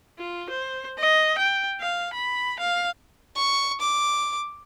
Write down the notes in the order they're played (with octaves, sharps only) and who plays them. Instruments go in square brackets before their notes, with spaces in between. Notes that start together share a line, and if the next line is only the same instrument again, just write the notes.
[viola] F4
C5
D#5
G5
F5
B5
F5
[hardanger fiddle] C#6
D6